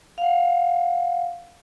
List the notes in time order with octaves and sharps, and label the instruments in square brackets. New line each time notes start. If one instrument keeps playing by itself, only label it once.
[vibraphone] F5 F#5